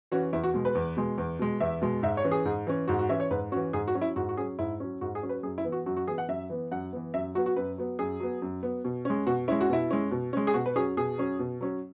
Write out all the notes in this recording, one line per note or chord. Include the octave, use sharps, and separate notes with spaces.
E3 C#4 F#4
E2 E4
F#4
B2 G#3
B4
E2
B2 G#3
E2
B2 G#3
E2 E5
B2 G#3
G#2 E5
C#5
E3 C#4
G#4
G#2
E3 C#4
G#2 F#4
F#4
E3 C#4 E5
C#5
G#2 B4
E3 C#4 F#4
G#2 G#4
F#4
F#3 C#4
E4
G#2 F#4
F#4
F#3 C#4 G#4
G#2 E4
F#3 C#4
G#2 F#4
G#4
F#3 C#4
B4
F#2 G#4
E4
E3 B3
F#4
F#2 F#4
F#4
E3 B3 G#4
F#5
F#2 E5
E3 B3
F#2 F#5
E3 B3
F#2 E5
F#3 B3 F#4
F#4
F#2 B4
F#3 B3
F#2 G#4
F#3 B3
F#2
F#3 B3
B2
G#3 C#4
B2 F#4
G#3 C#4 E4
F#4
B2 E4
G#3 C#4
B2
G#3 C#4
G#4
B2 F#4
B4
F#3 C#4 G#4
B2 G#4
F#3 C#4
B2
F#3 C#4